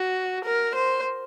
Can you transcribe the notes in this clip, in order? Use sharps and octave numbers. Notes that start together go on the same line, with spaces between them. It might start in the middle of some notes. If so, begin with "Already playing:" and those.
Already playing: F#4
A#4
C5